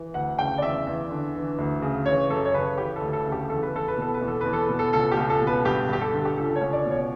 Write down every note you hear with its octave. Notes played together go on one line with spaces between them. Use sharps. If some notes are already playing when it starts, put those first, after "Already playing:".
Already playing: E3
D2 F#5
C#3 G5
D5
E2 E5
E2
D3
E3
D2
C#3
E3 C#5
F#2 A4
C#5
C#3 B4
E3 G4
A4
D2
A4
C#3
G4
E2 A4
B4
E2 A4
B4
B2 A4
B4
E2
A4
E2 B4
A4
B2 B4
A4
C#2 A4
G4
C#2
A4
B2
B4
G2 G4
G2 G4
A4
D3
G4
C#2 A4
C#5
C#2
D5
B2
C#5